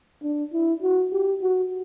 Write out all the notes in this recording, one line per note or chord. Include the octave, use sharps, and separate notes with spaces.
D4
E4
F#4
G4
F#4